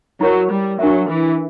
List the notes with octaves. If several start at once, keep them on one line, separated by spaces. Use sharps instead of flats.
F#3 E4 A#4 C#5
G3
F#3 D4 A#4 E5
E3